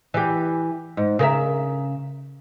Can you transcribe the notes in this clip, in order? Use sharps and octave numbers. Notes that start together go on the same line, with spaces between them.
E3 G4
G#2
C#3 A#4 E5